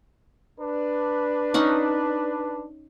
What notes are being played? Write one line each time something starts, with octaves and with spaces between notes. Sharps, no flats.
D4 B4
C#4 D#4 F#5